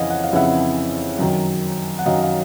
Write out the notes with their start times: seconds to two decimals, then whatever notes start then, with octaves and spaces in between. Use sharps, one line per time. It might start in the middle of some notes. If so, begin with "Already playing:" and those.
Already playing: F2 C#3 E3 D#5 F5 F#5 G#5
0.10 F#5
0.23 F5
0.33 F2 C#3 E3 E5 F#5
1.19 F#2 D#3 F#3
1.99 F#5
2.06 F#2 D#3 F#3 D#5 F5
2.22 F5